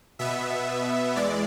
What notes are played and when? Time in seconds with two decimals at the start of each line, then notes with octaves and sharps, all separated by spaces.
0.19 B2 B3 E5
1.16 E2 G#3 D5